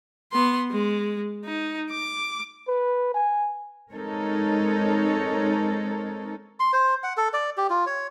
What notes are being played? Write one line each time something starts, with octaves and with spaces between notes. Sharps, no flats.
B3 C6
G#3
D#4
D6
B4
G#5
G#3 C4 D#4 A4 A#4 C#5
C6
C5
F#5
A4
D5
G4
F4
C#5